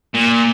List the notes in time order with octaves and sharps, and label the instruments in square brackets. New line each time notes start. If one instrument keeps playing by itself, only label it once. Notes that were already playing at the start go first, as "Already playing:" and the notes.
[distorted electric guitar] A#2